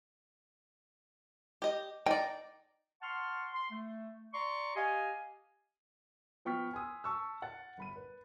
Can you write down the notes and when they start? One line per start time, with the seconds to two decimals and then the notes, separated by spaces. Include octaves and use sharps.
1.62 G4 D#5
2.07 D#4 D5 G5
3.01 F#5 A5 C6 C#6 F6
3.53 C6
3.71 A3
4.33 D5 A#5 C6 C#6
4.75 G4 D#5 F5 G#5
6.45 F3 B3 G5 C#6 F6 B6
6.73 G#5 C6 D#6 E6
7.04 A5 C#6 E6
7.42 F#5 A6
7.78 G1 B5 D#7
7.96 B4